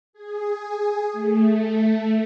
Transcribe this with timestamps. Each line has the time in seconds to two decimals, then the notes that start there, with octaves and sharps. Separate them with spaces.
0.13 G#4
1.12 A3